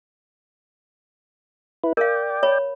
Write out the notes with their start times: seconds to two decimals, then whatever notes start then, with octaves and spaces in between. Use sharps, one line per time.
1.84 E4 B4
1.97 A#4 D5 F5 G5
2.43 C#5 B5